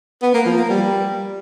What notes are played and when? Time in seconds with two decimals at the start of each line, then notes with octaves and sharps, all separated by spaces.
0.22 B3
0.34 A#3
0.46 F3
0.58 A#3
0.69 G3